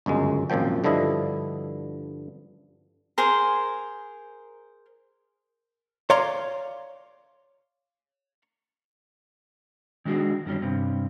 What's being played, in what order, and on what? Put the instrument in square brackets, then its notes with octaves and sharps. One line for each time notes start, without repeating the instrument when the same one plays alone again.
[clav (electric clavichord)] G1 C#2 F#2 G#3
G#1 F#2 A#2 F3 G5
G2 D3 F3 E4 D#5
[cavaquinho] G#4 A#4 C5 A#5
[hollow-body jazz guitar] C#5 D5 F5 A#5 C6
[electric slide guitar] D#3 G#3 D4 F#4 G#4
F#2 D3 D#3 G3 C#4
G2 C3